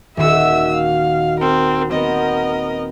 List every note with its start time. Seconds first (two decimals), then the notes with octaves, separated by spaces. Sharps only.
0.17 D#1 D#3 F#4 E5 E6
0.74 F5
1.40 C4 A#4
1.91 B3 C4 A#4 D#5